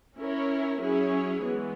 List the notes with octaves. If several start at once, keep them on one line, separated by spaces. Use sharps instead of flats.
C#4 E4 A#4 C#5
F#3 C#4 E4 G#4 C#5
E3 G#3 B3